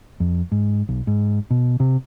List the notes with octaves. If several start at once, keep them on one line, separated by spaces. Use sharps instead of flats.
F2
G#2
B1
G#2
B2
C3